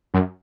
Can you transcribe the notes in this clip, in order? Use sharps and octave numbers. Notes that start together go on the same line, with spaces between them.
F#2